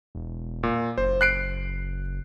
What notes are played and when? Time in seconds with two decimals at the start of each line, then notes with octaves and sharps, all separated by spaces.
0.15 E1
0.63 A#2
0.98 F#1 C5
1.21 F#6 C7 D7